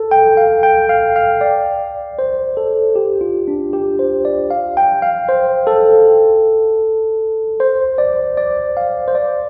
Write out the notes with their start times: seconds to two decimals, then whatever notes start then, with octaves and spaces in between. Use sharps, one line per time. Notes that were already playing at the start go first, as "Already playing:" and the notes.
Already playing: A4
0.11 G5
0.37 F5
0.63 G5
0.89 F5
1.16 F5
1.41 D5
2.19 C5
2.57 A4
2.96 G4
3.21 F4
3.48 D4
3.73 G4
3.99 C5
4.25 D5
4.50 F5
4.77 G5
5.02 F5
5.29 C5
5.67 A4
7.60 C5
7.98 D5
8.37 D5
8.77 F5
9.08 C5
9.15 D5